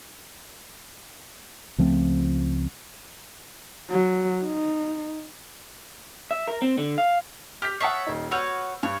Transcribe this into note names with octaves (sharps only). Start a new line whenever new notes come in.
C#2 F3 A3 C4
F#3
D#4
E5
A#4
C4
D3
F5
G4 F6 G6 B6
C#5 E5 F#5 A5 D#6 C7
D#1 D#4
F#4 B4 C#5 E6 F6 G6
G2 C#5